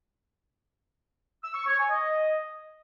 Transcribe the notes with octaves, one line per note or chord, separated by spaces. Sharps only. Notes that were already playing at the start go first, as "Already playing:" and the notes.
E6
C#6
C#5
G#5
D#5